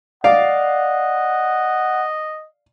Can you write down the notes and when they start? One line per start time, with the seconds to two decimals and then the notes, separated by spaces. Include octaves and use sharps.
0.24 D5 D#5 F5 F#5